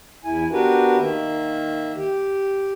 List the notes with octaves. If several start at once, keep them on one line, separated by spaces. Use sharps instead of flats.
E2 E4 G#5
B3 D4 F#4 G4 A#4 B4
D#3 A#3 E5
G4